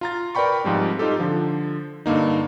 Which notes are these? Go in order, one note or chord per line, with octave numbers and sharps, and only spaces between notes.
F4 A#5 A6
A#4 B4 D5 G5 B5 C#6
G#2 F3 G3 C4
D#4 F4 G4 A4
D3 F3
G2 D3 A#3 D#4